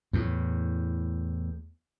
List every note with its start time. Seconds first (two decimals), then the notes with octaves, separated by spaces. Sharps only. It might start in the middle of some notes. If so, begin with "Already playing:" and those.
0.13 E2 A2